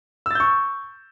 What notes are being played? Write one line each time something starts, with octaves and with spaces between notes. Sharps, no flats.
C#6 E6 G6 A6